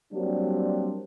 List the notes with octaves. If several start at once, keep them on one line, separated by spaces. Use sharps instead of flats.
F#3 G3 A#3 C4 D4